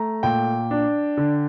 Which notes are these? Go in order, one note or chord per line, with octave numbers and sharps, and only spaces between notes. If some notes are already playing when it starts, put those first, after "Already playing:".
Already playing: A3 A#5
A#2 G5
D4
D3